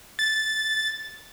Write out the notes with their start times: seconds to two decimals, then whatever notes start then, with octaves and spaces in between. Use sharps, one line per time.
0.19 A6